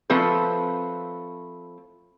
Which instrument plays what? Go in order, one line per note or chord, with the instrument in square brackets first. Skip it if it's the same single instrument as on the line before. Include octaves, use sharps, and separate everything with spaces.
[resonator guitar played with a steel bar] F3 A3 C4 B4